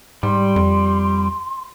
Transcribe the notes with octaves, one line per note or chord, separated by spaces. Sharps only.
G#2 G3 C6
F2